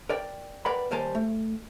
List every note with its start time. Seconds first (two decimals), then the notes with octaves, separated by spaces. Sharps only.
0.09 A#4 D5 G5
0.65 A#4 B4 D5 F#5 G5 B5
0.91 D#2 G3 A#4 C5 G#5 A5
1.15 A3